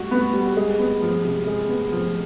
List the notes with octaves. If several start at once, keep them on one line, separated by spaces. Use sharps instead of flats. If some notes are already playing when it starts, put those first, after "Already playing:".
Already playing: G3 F#4
B3
G3
G#3
B3
F3
C3
G#3
B3
F3